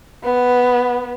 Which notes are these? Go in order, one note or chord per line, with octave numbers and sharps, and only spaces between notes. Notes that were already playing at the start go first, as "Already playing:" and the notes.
B3